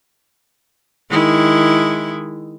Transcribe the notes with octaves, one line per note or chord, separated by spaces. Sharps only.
D#3 G#3 E4